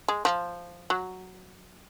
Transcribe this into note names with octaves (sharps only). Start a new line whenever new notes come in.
G#3
F3
F#3